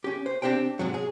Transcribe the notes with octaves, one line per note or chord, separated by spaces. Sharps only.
C#4 G4
C5
C4 D4 G4 C5 G5
G#2 C3 F#3
G#4